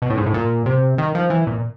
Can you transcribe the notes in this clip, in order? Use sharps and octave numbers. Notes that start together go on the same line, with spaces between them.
B2
A2
G#2
A2
A#2
C3
D#3
F3
E3
A#2